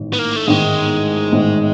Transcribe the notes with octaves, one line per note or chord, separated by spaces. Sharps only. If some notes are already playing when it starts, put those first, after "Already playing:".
Already playing: A1 G#2 D#3
B3
A#3
A3
A1 G#2 D#3 G#3
A1 G#2 D#3